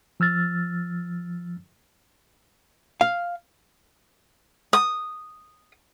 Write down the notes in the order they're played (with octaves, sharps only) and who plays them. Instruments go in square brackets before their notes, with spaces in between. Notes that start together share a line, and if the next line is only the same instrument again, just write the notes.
[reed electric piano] F3 E6 F6 A6
[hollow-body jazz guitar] F5
[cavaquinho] D#6